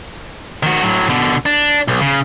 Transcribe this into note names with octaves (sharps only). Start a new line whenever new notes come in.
D#3 F#4
A2 F#3
B2 D3
D4
B1
C#3